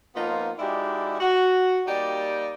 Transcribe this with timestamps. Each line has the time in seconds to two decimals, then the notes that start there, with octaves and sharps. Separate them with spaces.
0.15 F3 A#3 B3 D#4 F4
0.59 G#3 D#4 E4 F#4 G4 D5
1.21 F#4
1.87 G3 A#3 D#4 G4 D5